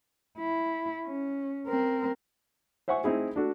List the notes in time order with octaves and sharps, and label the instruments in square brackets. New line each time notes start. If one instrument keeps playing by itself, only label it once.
[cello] E4
C#4
C4 A#4
[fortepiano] C5 E5 F#5 G#5 C#6
C4 D#4 E4 G#4
D4 F#4 A4